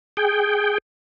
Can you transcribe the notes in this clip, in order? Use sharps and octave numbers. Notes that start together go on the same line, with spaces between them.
G#4 G5